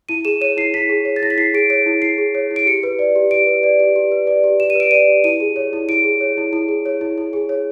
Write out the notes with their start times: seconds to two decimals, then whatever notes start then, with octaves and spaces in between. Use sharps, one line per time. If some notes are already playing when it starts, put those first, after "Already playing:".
0.09 E4 D#7
0.25 G#4 E7
0.41 C#5 D#7
0.57 E4 C7
0.74 E4 B6
0.89 G#4
1.05 C#5
1.16 A6
1.22 E4 A#6
1.30 B6
1.38 E4 C7
1.54 G#4 D7
1.70 C#5 D7
1.86 E4
2.02 E4 C7
2.18 G#4
2.35 C#5
2.51 E4
2.56 D7
2.66 G4 C#7
2.83 B4
2.99 D5
3.15 G4
3.31 G4 D7
3.47 B4
3.63 D5
3.80 G4
3.96 G4
4.12 B4
4.27 D5
4.44 G4
4.60 G4 E7
4.70 D#7
4.75 B4 D7
4.91 D5 D#7
5.08 G4
5.24 E4 D#7
5.40 G#4
5.56 C#5
5.73 E4
5.89 E4 D7
6.04 G#4
6.21 C#5
6.37 E4
6.53 E4
6.68 G#4
6.86 C#5
7.01 E4
7.18 E4
7.33 G#4
7.49 C#5